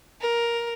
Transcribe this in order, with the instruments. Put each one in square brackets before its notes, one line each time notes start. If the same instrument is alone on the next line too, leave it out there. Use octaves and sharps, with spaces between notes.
[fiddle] A#4